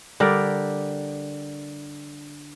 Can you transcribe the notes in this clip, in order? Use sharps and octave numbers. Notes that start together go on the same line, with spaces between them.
D3 G3 A#4 D5